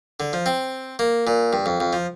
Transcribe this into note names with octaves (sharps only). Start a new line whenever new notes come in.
D3
F3
C4
A#3
A#2
G2
F2
F2
F3